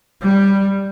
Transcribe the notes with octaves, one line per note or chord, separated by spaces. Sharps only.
G3